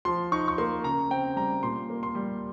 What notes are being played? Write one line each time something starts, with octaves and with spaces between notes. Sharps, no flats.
F3 C6
D#4 C#6
C#6
A#3 C6
C#3 A#5
C4 G5
G3 A#5
A#2 C6
A#3
C6
G3